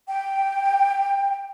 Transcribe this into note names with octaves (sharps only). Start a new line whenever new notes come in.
G5